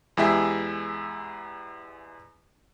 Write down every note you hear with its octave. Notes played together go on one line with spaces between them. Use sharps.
E2 G#3 E4 G4 G#4 E5